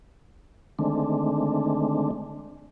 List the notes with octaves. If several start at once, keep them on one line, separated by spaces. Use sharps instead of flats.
D3 D#3 G#3 A3 C4 D4